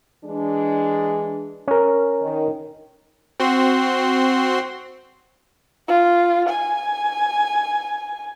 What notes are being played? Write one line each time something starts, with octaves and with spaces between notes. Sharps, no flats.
E3 G#3 D4
C#4 A#4
D#3
C4 F#4 C6
F4
G#5